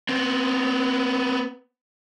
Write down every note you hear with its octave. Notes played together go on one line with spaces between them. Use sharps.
B3 C4